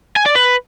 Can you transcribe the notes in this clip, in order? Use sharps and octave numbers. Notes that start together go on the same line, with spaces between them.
G#5
D5
B4